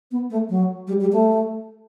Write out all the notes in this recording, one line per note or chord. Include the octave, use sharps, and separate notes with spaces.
B3
A3
F#3
G3
G3
A3